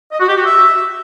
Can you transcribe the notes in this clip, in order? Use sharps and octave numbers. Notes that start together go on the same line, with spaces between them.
D#5
F#4
G4
F#4
E5